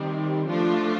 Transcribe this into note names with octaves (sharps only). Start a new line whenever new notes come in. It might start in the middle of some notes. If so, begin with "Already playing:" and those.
Already playing: C3 D#3 G3 C4
F3 A3 D4 F4